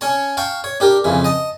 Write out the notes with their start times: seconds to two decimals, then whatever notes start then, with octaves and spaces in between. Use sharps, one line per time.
0.01 C#4 C#5 A5
0.37 F5 G5 A5 C#6
0.64 C#5
0.80 D4 G4 A#4
1.04 F2 C#3 E3
1.24 D#5 A5